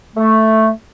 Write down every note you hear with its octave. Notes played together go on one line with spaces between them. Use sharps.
A3